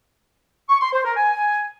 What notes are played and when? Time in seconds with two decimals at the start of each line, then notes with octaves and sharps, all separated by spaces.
0.69 C#6
0.81 C6
0.93 C5
1.05 A#4
1.16 G#5